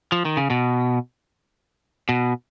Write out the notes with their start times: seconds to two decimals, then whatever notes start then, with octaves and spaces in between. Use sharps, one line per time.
0.12 F3
0.25 D#3
0.37 C#3
0.50 B2
2.09 B2